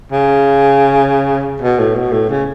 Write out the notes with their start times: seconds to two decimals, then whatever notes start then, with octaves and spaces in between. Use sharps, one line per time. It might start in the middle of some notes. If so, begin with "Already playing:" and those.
0.12 C#3
1.62 B2
1.79 A2
1.96 B2
2.12 A2
2.29 C#3